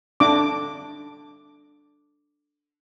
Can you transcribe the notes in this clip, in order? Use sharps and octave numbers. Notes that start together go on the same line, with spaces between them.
D4 D6